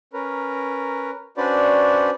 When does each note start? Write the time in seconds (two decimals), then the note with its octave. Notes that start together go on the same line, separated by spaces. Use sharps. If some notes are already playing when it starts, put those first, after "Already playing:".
0.13 C#4 A#4 B4
1.37 C#4 D4 F#4 B4 C5 D5